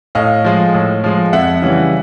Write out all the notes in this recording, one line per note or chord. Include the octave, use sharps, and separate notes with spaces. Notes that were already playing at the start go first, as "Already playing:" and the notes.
A2 D#5 F5
F3 G#3
A2
F3 G#3
F2 E5 F#5
C#3 E3 G3